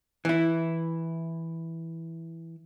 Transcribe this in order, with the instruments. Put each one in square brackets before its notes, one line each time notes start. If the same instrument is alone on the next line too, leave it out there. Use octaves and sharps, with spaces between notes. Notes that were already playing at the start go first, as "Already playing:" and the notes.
[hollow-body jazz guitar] E3 E4